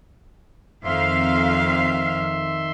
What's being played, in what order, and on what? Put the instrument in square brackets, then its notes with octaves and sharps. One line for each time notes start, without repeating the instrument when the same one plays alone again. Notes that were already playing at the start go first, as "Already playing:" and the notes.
[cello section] F2 F5 [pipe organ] D#3 E5 C6